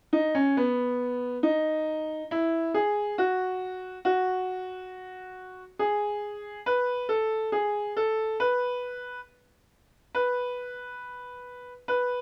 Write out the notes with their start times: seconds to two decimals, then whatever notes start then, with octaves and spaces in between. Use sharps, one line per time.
0.13 D#4
0.35 C#4
0.57 B3
1.43 D#4
2.31 E4
2.74 G#4
3.18 F#4
4.05 F#4
5.79 G#4
6.66 B4
7.09 A4
7.52 G#4
7.97 A4
8.40 B4
10.15 B4
11.88 B4